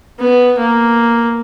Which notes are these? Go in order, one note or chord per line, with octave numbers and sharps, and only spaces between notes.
B3
A#3